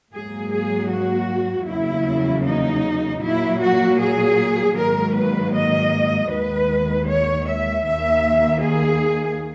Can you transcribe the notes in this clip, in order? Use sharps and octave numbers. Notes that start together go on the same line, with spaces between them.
G#2 F#3 A#3 G#4
G#4
F#4
E2 C#3 F#3 A#3 E4
D#4
A#2 F#3 A#3 E4
F#4
G#4
G#2 D#3 F#3 A#3 A#4
B4
D#5
D#2 D#3 G#3 B4
C#5
E5
D#2 D#3 A#3 E5
G#4